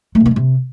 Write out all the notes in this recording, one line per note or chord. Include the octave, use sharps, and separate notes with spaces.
A3
C3
A#3
G#3
C3